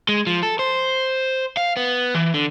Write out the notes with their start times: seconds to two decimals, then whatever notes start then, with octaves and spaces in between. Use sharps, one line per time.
0.09 G#3
0.27 F3
0.43 A4
0.59 C5
1.57 F5
1.77 B3
2.15 E3
2.34 D3